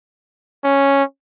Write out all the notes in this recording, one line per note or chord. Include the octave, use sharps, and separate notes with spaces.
C#4